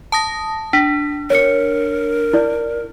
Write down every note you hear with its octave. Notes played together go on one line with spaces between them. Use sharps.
A5 D#6 A#6
D4 B6
A#4 C#5 C#7
E4 D5